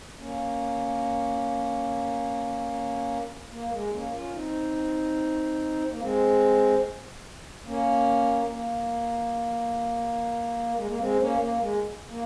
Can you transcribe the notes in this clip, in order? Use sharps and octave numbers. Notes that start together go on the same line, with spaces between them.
A#3 C#4
A#3
G#3
A#3 C#4
C#4 F4
C4 D#4
A#3
G#3 C4
A#3 C#4
A#3
G#3
A#3
G#3 C4
A#3 C#4
A#3
G#3
A#3